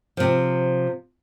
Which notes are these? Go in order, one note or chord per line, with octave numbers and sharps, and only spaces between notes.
C3 F3